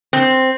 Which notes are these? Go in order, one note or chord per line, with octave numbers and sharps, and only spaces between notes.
C4